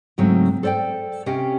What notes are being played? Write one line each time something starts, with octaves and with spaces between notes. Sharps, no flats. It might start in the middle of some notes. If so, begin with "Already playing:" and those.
G#2 C#3 F#3 A3 C4 C#4
A4 C5 D5 F#5 G5
C3 C#4 G4 D#5 F5 G5